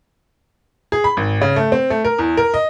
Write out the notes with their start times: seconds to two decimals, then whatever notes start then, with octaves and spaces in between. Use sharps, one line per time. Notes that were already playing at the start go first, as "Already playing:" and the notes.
0.92 G#4
1.04 B5
1.17 G#1
1.41 C#3
1.56 A3
1.72 C4
1.90 A3
2.05 A#4
2.19 E2
2.37 A#4
2.54 D#5